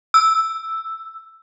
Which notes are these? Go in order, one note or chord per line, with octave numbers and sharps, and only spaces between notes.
E6